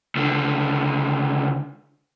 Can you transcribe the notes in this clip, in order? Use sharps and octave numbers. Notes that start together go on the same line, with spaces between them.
C#2 D3